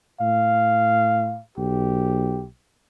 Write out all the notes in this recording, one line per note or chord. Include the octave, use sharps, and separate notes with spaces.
A2 F5
B1 G4